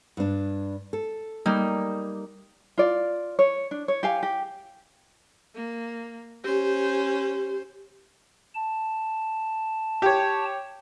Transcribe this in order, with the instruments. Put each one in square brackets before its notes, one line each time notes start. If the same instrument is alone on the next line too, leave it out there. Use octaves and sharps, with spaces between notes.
[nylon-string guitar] G2 D4
A4
[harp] G3 A#3 D#4
[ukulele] F4 D5
C#5
D4
C#5
G4 F5 G#5
G4
[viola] A#3
[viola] C#4 C5 [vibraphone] G4
[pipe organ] A5
[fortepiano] G4 C#5